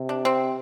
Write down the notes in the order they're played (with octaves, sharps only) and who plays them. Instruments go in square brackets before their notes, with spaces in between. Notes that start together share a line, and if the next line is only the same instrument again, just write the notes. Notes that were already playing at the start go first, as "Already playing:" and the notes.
Already playing: [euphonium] C3
[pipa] D4
C4